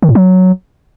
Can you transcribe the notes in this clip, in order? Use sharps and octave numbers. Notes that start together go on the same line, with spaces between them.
D#3
A2
F#3